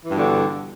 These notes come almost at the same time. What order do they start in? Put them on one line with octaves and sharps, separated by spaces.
E3 G2 B2 D3